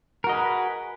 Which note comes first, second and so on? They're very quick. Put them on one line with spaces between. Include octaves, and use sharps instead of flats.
A#4 F#4 D#5 G#4 B4